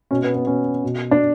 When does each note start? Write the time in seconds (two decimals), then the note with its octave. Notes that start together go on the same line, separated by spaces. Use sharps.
0.11 B2 C#4
0.23 B3
0.35 B3
0.46 B2 C#4
0.84 B2
1.11 D4